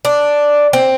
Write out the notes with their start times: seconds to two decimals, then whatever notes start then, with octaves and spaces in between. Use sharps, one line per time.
0.05 D4
0.73 C4